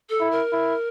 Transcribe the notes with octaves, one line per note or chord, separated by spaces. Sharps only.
A4
E4
A#4
E4